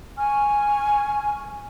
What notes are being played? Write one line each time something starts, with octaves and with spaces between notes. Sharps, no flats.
G#5 C#6 F6